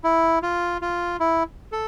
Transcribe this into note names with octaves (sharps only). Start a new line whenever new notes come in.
E4
F4
F4
E4
A4